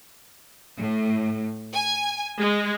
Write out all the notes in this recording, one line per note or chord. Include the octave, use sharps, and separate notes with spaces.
A2
G#5
G#3